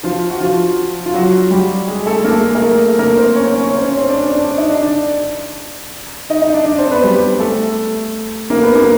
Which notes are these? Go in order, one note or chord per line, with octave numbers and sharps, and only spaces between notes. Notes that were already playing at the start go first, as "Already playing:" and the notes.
F3 F4
F#4
F3 F4
F4
F#3 F#4
G3 G4
G#3 G#4
A3 A4
A#3 A#4
G#3 G#4
G#3 G#4
A#4
A3 A4
A#3 A#4
C4 C5
C#4 C#5
C#4 C#5
C#4 C#5
C5
C#4 C#5
C4 C5
D4 D5
D4 D5
D4 D5
D#4 D#5
D4 D5
D4 D5
D#4 D#5
D#4 D#5
D4 D5
D4 D5
C4 C5
B3 B4
G3 G4
A3 A4
A#3 A#4
B3 B4
A#3 A#4